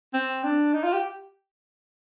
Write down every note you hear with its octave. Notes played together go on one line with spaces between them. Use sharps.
C4
D4
D#4
F4
G4